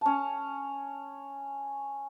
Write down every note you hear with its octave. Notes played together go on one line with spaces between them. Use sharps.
C#4 A5